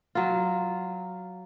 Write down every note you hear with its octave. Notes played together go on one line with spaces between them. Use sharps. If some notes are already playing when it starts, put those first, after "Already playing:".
F#3 F4